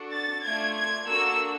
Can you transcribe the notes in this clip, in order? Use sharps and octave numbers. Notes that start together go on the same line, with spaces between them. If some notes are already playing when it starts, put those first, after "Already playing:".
Already playing: D4 F#4 A4
A6
A3 D4 F4 G#6
G#6
A#3 D4 F#4 A4 E6